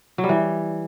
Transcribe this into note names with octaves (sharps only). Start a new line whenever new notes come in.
F#3
G3
E3